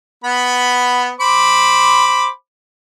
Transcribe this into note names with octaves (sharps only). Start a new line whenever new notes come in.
B3 B5
C5 B5 D6